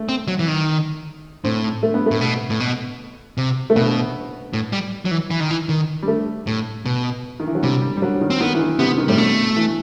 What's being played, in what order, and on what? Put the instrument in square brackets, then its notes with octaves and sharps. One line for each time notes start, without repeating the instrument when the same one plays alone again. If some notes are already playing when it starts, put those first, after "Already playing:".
Already playing: [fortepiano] A3
[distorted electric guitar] C4
F#3
E3
D#3
[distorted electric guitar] A2 [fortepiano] C4
[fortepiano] A3
B3
A3
[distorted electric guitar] A2
B2
A2
B2
C3
[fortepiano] A3
[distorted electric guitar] B2 [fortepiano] B3
[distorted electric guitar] A2
G3
F#3
E3
E3
D#3
E3
D#3
[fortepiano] G3
A3
[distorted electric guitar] A2
B2
[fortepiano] D#3
E3
F#3
[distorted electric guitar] C3 [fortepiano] G3
[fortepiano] G3
G3
F#3
D#3
[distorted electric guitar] C4
[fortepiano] D#3 [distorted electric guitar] B3
[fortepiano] E3
D#3
[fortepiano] C3 [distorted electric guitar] B3
[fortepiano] D#3
[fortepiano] A2 [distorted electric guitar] G3
[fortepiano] B2 [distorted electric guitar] A3
[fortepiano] E3